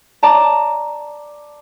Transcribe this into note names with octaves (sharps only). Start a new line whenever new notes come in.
D5 A5 A#5